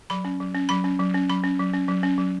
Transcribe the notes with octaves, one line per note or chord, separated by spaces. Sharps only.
F#3 B5
C#4
F#3
C#4
F#3 B5
C#4
F#3
C#4
F#3 B5
C#4
F#3
C#4
F#3
C#4
F#3